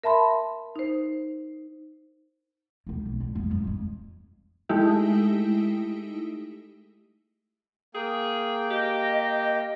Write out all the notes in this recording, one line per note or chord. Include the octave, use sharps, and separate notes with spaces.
A#4 E5 A5 B5 C6
D#4 C5
D2 C3
B1
A2 D3
F2 B3
F#2 F#3
F2 G#3
G#3 A3 D#4 E4 G4
A#3 G#4 G5
G4 D#5